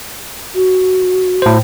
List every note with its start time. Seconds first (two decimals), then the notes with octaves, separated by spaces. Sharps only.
0.55 F#4
1.42 A2 C5